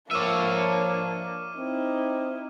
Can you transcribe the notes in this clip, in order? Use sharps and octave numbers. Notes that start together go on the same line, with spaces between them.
F3 A#3 D4 C#5 E5 D6 F6 D#7
C4 D#4 E4